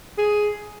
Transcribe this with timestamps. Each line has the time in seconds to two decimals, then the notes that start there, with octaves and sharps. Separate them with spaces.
0.18 G#4